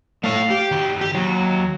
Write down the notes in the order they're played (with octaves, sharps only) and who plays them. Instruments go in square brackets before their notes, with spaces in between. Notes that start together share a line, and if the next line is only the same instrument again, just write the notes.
[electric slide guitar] A3 A4 C#5 [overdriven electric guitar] F5
[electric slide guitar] G4
[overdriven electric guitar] D#3 F#4
[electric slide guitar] G4
[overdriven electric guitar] D#2 [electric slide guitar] F#3